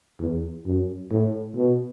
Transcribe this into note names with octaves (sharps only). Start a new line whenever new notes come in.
E2
F#2
A2
B2